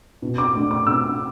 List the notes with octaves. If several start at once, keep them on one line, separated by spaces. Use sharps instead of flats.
B2
D6
A3 D4
D6
B2 E6